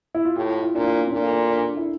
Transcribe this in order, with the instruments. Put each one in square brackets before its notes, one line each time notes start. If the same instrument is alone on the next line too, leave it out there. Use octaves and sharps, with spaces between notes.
[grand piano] E4
F4
[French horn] A2 [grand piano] G4
[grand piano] F4
E4
[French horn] A#2 [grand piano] D4
[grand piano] F4
D4
C#4
[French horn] A#2 [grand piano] D4
[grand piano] A4
D4
D4
D4
E4